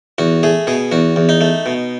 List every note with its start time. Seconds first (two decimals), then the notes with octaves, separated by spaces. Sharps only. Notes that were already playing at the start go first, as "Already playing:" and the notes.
0.18 E2 F#4
0.43 A3 G#4
0.67 B2 G#4
0.92 E2 F#4
1.16 E2
1.29 D#4
1.41 A3
1.66 B2